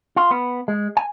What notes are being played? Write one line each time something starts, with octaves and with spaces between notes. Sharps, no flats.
F4
B3
G#3
G#5